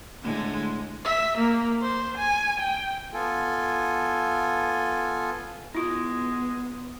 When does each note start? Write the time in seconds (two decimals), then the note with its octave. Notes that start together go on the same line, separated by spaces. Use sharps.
0.22 A2 D3 G#3
1.05 E5
1.38 A#3
1.81 C5
2.18 G#5
2.60 G5
3.14 B3 F4 A4 G#5
5.75 G#3 B3 E4 F4